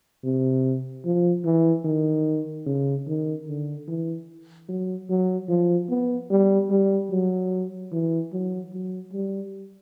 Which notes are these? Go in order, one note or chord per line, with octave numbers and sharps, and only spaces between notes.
C3
F3
E3
D#3
C#3
D#3
D3
E3
F#3
F#3
F3
B3
G3
G3
F#3
E3
F#3
F#3
G3